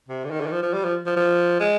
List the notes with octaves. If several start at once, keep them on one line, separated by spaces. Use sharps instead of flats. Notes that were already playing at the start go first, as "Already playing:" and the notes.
C3
D3
D#3
D3
D#3
F3
F3
G3
F3
F3
F3
G#3